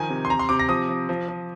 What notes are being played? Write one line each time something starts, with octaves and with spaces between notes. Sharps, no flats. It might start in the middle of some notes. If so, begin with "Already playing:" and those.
Already playing: D#3 F3 G#5
C3
C6
C3 A#5
C6
C3 D6
A#6
F3 D#6
F3
F3
F3